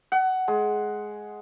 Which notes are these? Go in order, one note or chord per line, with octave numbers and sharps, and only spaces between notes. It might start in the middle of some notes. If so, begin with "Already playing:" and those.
F#5
G#3